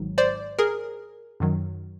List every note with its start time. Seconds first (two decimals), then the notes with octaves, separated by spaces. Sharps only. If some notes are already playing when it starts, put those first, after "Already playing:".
Already playing: G#1 G#2 D#3 F#3
0.18 C5 D5
0.59 G#4 A#4
1.40 F#2 D#3 F#3